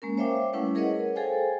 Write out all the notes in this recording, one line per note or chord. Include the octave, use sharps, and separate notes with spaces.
G#3 A#3 C#4 A#4
C5 C#5 E5 F5 G5 D6
G3 A3 C#4 E4 B4 F#5
G#4 A#4 B4 C#5 D#5 F#5
G#4 A4 C5 F5 G5 G#5